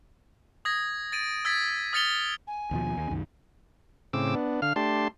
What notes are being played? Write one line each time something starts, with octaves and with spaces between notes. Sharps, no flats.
D#6 G#6 A#6
A6 D7 D#7
E6 G#6 A6 B6
D#6 F6 A6 C#7 F7 G7
G#5
D#2 B2 F3
D#2
C2 F#2 D#3
A2 C#3 C4 D6 E6
B3 D4
D3 F5 F6
A3 D4 G4 A5 C6